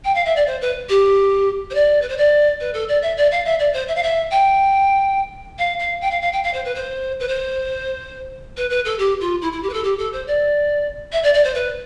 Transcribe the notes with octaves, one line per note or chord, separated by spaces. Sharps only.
G5
F5
E5
D5
C5
B4
G4
C5
D5
B4
C5
D5
B4
A4
D5
E5
D5
F5
E5
D5
C5
E5
F5
E5
G5
F5
F5
G5
F5
F5
G5
F5
C5
B4
C5
B4
C5
B4
B4
A4
G4
F4
E4
E4
G4
B4
A4
G4
A4
C5
D5
E5
D5
D5
C5
B4